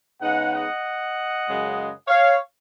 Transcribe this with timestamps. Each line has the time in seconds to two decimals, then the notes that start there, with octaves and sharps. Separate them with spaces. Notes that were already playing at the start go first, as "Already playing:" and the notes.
0.21 C#3 G#3 B3 D#4 D#5 F#5
0.53 D#5 F#5
1.46 F#2 C#3 G#3
2.07 C#5 F5